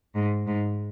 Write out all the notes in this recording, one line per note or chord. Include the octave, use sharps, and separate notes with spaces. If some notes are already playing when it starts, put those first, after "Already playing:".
G#2
G#2